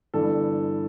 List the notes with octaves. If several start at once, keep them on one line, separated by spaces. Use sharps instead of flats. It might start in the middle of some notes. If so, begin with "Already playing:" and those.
G1 G2 E3 A4